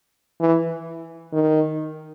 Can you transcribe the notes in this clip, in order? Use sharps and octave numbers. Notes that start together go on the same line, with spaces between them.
E3
D#3